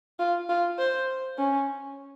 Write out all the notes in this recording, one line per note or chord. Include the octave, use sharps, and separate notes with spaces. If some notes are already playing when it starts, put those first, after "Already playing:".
F4
F4
C5
C#4